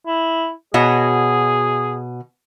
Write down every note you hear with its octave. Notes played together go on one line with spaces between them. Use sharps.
E4
B2 G#4 C#5 D#5